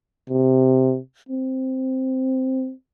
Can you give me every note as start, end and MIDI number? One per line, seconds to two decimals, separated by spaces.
0.30 0.99 48
1.29 2.73 60